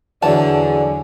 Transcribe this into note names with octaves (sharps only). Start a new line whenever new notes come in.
E2 D3 F#3 G#4 D5 A5